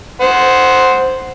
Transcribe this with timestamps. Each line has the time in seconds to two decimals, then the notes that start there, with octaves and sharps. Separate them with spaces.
0.21 C5 F#5